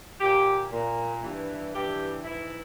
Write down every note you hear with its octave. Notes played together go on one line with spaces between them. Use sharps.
A#2 G4
A#2
G2 E3
G2 E3 G4
G#2 E3 E4